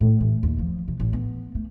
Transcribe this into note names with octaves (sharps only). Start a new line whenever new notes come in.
A2
E3
D#2
F3
C3
A1
B3
A3